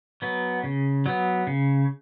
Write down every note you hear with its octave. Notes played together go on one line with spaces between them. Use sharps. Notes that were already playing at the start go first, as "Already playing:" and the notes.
F#3 B3
C#3
F#3 B3
C#3